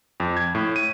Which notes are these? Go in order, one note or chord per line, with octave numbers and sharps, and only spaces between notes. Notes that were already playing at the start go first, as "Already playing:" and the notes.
F2
G#6
A2
D#7